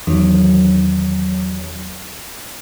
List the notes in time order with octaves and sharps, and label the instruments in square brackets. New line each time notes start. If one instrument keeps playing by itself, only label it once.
[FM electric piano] E2 D#3 F#3